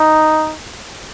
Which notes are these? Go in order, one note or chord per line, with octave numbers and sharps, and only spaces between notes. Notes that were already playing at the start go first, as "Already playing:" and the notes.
Already playing: D#4